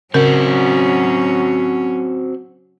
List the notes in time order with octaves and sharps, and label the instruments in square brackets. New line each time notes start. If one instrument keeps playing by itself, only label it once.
[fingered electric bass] C#3 [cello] F#3 C#4 [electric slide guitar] C4 F#4 [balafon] A#4